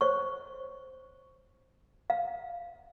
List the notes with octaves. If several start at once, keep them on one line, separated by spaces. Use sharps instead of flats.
C5 C#5 C#6
F5